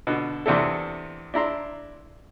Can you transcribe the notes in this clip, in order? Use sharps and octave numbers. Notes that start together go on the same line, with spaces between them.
B2 D3
E2 C3 D4 E4 A4
D4 E4 A#5 C6